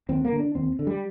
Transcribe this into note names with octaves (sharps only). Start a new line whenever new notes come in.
D#2 C4
A#3
D3
D4
D#2 C4
D3
G3